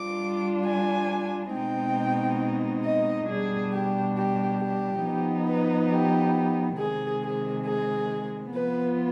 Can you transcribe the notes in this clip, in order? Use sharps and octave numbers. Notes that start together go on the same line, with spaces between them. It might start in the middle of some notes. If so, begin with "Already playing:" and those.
Already playing: G3 D4 F4 D6
G#5
B2 G#3 C4 D#4 G5
D#5
B2 G3 D4 G#4
G4
G4
G4
F3 B3 D#4
B4
G4
C3 D#3 G#3 G#4
G#4
G#4
F3 B3 F4 B4